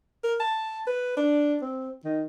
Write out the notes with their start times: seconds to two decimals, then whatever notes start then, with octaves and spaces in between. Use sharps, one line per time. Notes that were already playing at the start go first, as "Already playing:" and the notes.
0.24 A#4
0.40 A5
0.87 B4
1.17 D4
1.62 C4
2.05 D#3